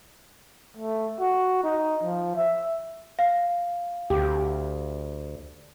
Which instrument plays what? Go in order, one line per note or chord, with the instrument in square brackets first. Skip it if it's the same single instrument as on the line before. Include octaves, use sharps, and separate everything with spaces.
[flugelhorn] A3
F#4
D#4
F3
E5
[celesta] F5
[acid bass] D2 [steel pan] G4